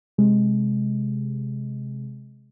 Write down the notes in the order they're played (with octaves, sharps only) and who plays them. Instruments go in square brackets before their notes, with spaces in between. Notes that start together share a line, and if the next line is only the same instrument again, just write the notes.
[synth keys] C3 G#3